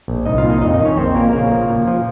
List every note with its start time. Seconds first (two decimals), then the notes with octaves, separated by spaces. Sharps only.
0.08 A#1
0.25 C2 D#4 D#5
0.38 F4 F5
0.44 A#2
0.50 D#4 D#5
0.61 F2 D#4 D#5
0.73 D#4 D#5
0.80 D#3
0.85 C#4 C#5
0.97 A#1 C4 C5
1.15 A#2 A#3 A#4
1.33 C#3 A#3 A#4
1.51 F3
1.70 A#2
1.88 F3